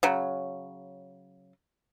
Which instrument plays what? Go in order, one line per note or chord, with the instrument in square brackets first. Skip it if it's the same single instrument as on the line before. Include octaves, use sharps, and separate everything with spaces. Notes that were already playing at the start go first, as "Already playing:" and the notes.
[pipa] C#3 F#3